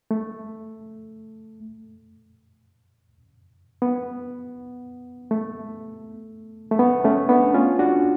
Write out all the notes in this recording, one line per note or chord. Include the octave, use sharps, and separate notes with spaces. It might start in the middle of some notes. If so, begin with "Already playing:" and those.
A3
B3
A3
A3
B3
A3 C#4
B3 D4
C#4 F4
D4 F#4